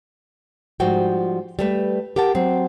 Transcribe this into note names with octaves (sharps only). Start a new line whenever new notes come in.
G#2 F3 G3 F#4 G5
G3 A3 B4
G4 A#4 F#5 A5
F#3 C4